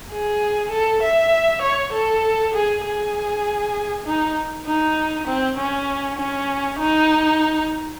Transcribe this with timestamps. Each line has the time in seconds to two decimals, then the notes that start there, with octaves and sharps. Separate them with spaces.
0.11 G#4
0.71 A4
1.02 E5
1.62 C#5
1.93 A4
2.54 G#4
2.84 G#4
4.06 D#4
4.66 D#4
5.28 C4
5.57 C#4
6.18 C#4
6.79 D#4